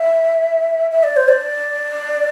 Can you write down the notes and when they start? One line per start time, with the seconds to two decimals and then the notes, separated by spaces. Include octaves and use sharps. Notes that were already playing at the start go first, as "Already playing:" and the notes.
Already playing: E5
0.91 E5
1.03 D5
1.17 C5
1.28 D5